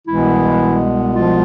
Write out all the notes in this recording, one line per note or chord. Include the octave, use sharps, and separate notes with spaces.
C2 B2 E3 G#3 B3 E4
F3 F4